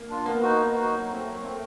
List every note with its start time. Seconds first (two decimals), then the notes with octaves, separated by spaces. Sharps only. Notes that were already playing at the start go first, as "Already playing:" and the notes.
Already playing: A#3
0.10 D4 F4
0.26 A#3 B3
0.42 D#4 F#4
0.58 B3
0.76 D#4 F#4
0.91 F#3
1.08 A3 C4
1.24 F#3
1.41 A3 C4